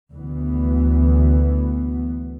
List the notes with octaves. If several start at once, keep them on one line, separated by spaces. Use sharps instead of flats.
D2 E3 B3